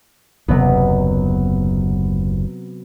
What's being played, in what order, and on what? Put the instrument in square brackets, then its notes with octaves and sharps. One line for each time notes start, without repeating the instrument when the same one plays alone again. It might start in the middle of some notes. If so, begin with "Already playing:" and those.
[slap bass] F#1 D#2 [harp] C3 F#3 B3